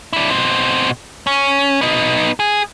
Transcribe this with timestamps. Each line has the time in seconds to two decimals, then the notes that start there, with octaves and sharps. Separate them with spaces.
0.13 D4 E4
0.30 B2 C4
1.27 C#4
1.81 B3 D#4
2.40 G#4